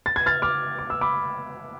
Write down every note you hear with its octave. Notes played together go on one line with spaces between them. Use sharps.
A6
G#6
F6 A6
D6 F6
D6
E6
B5 D6